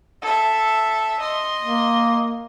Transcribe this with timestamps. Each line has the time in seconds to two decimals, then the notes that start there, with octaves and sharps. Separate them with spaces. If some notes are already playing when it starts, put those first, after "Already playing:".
0.22 A4 E5
1.20 D#5 C6
1.63 A#3